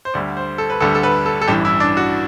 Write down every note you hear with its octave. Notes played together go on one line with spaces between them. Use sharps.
C5
D2 D3 G3 D5
C5
A4
B4
D2 D3 G3 A4
A4
B4
A4
A4
A1 G2 E3 G4
E4
D4
F#4